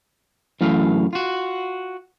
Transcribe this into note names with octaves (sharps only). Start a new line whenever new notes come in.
F#2 E3 A3 E4 F5
F4 F#4